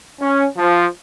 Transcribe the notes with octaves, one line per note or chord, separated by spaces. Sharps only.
C#4
F3